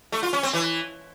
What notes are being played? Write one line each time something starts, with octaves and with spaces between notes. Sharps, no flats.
A3
F4
C#4
C4
E3